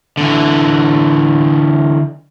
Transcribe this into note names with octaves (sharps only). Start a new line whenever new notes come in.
D3 E3